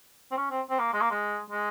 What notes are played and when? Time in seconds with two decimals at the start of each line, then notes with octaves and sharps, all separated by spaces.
0.32 C4
0.37 C#4
0.51 C4
0.70 C4
0.79 A#3
0.93 G#3
1.01 A#3
1.11 G#3
1.50 G#3